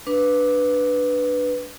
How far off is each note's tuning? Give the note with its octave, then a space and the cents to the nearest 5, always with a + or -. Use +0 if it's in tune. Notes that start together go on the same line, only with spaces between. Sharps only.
D4 +0 B4 +0